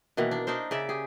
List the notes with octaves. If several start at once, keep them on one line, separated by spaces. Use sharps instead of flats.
B2 D#3 E3 A#3
D4
D4 D#4 A#4 C5
C#3 D5 E5
G4 G#4